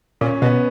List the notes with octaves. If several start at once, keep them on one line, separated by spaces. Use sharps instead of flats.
A#2 C#4
B2 B3